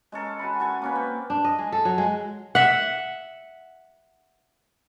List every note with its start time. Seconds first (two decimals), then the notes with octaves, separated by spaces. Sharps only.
0.12 G#3 C#4 A4 A#4
0.39 F#4 G#5 B5
0.60 F#4 A4 G#5
0.82 A#3 C#4 B4
0.95 C4
1.30 D4
1.44 D#5
1.59 G#3
1.72 A4
1.85 F#3
1.98 G#3
2.55 E5 F#5